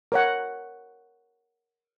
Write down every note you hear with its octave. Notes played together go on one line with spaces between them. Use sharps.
A#4 C#5 F#5